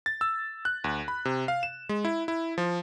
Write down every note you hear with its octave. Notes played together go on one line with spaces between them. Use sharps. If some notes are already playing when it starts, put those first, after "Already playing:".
A6
E6
F#6
D2
B5
C3
F5
E7
G#3
E4
E4
F3